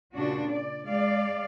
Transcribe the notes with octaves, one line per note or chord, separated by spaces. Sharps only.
A#2 C#3 D4 F#4
D5
G#3 D5 F5